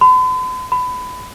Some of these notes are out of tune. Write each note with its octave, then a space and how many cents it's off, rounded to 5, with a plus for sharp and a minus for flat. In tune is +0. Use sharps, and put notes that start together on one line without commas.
B5 +45
B5 +25